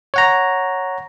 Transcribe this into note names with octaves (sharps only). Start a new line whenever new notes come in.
C#5 F#5 A#5